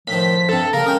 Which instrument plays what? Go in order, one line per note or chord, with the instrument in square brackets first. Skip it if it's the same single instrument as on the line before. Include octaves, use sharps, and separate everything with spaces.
[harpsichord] A2 D#3 [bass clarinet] F3 [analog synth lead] B6
[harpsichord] G2 C3 [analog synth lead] A4
[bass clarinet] C#3 [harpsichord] G3 A#3 [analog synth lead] A#4
[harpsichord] G#3 G5 D#6 [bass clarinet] C#4